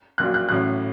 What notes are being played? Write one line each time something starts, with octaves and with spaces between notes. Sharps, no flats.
A#1 A#2 F#3 F#6
F#6
A1 A2 F#3 F#6